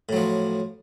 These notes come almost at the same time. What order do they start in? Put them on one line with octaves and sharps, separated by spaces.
A2 F#3 F3